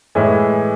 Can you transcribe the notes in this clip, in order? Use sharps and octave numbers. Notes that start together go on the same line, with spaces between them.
A2 E3 G#3